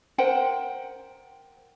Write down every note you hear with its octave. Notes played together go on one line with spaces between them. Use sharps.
A#4 C5 F#5 G5